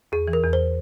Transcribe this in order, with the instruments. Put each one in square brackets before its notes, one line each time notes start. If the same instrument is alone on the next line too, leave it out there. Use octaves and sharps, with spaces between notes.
[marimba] E2 [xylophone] G#4
[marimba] E3
[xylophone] A#4
[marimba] E2
[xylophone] C5